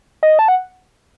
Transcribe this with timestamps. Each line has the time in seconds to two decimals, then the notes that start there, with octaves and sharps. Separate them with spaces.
0.23 D#5
0.39 A5
0.48 F#5